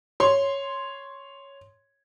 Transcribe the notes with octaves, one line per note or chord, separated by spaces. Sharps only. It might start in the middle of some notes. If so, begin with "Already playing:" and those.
C#5 C6